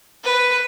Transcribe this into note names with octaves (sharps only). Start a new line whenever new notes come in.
B4